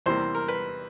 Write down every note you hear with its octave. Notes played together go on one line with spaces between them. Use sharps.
E2 C3 E3 G3 A#3 C5
A#4
B4